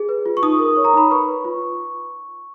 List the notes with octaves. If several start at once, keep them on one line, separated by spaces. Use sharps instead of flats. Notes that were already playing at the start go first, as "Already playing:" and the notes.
Already playing: G#4
B4
F4
C#6
D#4 D#6
A#4
C#5
A#5
D#4 B5
B4 C#6
B4
F4